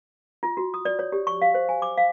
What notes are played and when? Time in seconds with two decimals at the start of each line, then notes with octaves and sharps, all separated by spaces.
0.43 F4
0.57 F#4
0.74 D#6
0.85 D5
0.99 C#5
1.12 G4
1.27 C#6
1.42 F5
1.54 C5
1.69 G#5
1.82 D6
1.98 F5